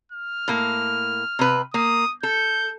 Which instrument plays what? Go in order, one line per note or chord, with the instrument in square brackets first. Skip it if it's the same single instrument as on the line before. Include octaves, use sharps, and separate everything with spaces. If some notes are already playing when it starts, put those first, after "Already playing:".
[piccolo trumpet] F6
[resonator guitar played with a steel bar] A2 A#3
C3 B4
[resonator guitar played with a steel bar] A#3 [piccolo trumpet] D#6
[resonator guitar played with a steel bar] A4 [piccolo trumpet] G6